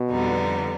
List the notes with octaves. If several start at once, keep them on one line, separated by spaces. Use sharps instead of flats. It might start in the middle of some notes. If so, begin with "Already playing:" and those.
Already playing: B2
F2 D3 G3 B3 D#4